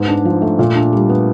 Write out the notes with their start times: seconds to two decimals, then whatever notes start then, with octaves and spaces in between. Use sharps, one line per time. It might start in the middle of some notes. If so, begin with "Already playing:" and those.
Already playing: G#2 B3
0.08 D4
0.25 F3
0.42 A3
0.59 A#2
0.76 D4
0.93 G3
1.09 B3